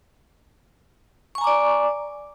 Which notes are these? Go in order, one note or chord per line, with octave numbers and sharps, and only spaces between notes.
D5 G#5 A#5 C#6 D6